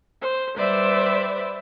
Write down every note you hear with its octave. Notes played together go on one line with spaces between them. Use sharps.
C5
G3 B4 C5 D5 E5